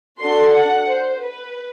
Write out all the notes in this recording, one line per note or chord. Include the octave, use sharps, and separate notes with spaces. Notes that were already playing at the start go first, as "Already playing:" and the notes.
D4 F#4 A4 C6
F#5
C5
B4